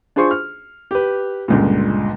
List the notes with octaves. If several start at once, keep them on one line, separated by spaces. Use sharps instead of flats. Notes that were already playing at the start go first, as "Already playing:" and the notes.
D4 F4 G#4 C5 C6 C#6
F6
G4 B4
G1 C#2 A#2